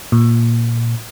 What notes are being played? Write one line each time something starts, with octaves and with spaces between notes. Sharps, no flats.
A#2